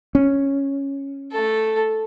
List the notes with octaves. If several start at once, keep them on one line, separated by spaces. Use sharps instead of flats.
C#4
A3 A4